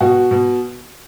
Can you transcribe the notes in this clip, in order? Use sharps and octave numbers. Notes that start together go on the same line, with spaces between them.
B2 F#4
B2